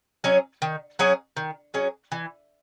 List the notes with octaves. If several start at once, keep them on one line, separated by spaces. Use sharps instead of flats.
F#3 C#4 G#4
D#3
F#3 C#4 G#4
D#3
F#3 C#4 G#4
E3